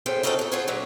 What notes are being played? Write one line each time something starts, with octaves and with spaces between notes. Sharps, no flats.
E2 A2 C#4 A4 C5 G5
C4 C#4 D#4 F4 F#4 A4
F2 A4
C#3 F4 F#4 G#4 C5 C#5
A#2 D3 F#3